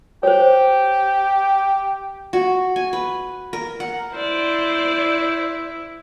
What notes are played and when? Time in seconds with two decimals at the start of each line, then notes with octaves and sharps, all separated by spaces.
0.23 G4 C5 C#5
2.33 F#4
2.76 G#5
2.93 B4
3.53 A#4
3.80 F#5
4.14 E4 C5 D5